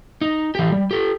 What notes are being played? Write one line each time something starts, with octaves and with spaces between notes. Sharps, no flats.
D#4
E3 G4
G3
G4 A4